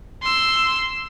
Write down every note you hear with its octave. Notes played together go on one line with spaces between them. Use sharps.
C6 E6